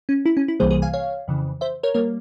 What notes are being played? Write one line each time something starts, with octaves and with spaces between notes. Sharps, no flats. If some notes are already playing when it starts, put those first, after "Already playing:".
C#4
E4
C#4
E4
C2 C3 E3 G3 A#3 G#4 C5
G#4 C5
F5 G#5
C#5 F5
F2 C#3 E3
C5 E5
A#4 C#5
G3 A#3 A#4 C#5